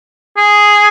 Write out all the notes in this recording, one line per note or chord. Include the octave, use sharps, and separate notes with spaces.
G#4